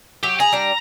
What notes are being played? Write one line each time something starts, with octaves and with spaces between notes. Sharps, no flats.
F#3 G4
G#4 A#5
G3 D4